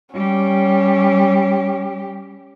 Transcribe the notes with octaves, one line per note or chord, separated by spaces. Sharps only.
G3 C#4 G4